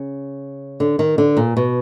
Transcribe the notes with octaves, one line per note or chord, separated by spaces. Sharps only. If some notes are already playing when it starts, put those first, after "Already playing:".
Already playing: C#3
D3
D#3
D3
A#2
B2